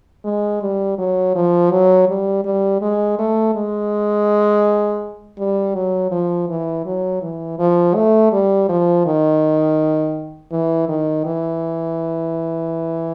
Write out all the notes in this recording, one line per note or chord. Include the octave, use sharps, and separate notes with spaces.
G#3
G3
F#3
F3
F#3
G3
G3
G#3
A3
G#3
G3
F#3
F3
E3
F#3
E3
F3
A3
G3
F3
D#3
E3
D#3
E3